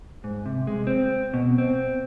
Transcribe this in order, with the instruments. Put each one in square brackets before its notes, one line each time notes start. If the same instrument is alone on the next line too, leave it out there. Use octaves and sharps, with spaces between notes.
[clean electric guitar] G#2
C3
G#3
C4
B2
C4